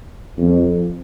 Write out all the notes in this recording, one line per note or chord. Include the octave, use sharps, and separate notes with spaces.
F2